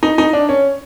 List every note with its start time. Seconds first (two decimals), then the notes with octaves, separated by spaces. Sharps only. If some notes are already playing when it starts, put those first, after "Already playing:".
0.03 D#4
0.18 D#4
0.33 D4
0.49 C#4